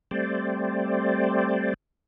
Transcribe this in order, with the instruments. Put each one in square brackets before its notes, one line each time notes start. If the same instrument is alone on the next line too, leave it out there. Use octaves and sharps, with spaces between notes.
[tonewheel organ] G3 A3 C4 C5 D5